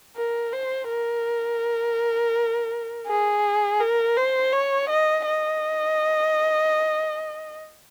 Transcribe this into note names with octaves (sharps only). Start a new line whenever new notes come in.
A#4
C5
A#4
G#4
A#4
C5
C#5
D#5
D#5